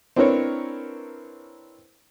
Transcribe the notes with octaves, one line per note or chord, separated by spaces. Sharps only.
C4 D4 E4 A#4 B4 C#5